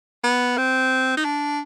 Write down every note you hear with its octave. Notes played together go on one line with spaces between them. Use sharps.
B3
C4
D#4
D4